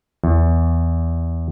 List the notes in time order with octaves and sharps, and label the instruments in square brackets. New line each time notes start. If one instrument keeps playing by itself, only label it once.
[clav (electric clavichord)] E2